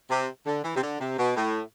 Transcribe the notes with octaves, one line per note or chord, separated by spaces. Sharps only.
C3
D3
E3
C3
D3
C3
B2
A2